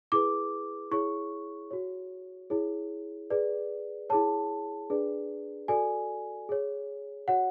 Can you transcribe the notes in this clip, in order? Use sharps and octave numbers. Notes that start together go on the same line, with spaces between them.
E4 G#4 B4 D6
E4 G#4 C#5 C#6
F#4 C#5
E4 G#4 C#5
G#4 B4 D5
E4 G#4 C#5 A5
D4 G#4 B4 D5
F#4 A4 D5 G#5
G#4 C#5
F#4 C#5 F#5